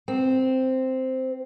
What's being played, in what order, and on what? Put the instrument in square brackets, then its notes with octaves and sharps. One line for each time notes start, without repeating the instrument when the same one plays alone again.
[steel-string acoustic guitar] C4